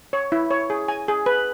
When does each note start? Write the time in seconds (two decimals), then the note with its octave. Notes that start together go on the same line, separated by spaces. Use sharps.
0.13 C#5
0.32 E4
0.51 C#5
0.70 G#4
0.88 G#5
1.08 G#4
1.26 B4